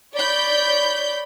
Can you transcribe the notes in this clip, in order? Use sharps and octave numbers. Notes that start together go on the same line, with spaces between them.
C#5 D5 B5 G6